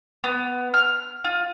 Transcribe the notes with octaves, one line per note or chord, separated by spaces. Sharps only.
B3
F6
F4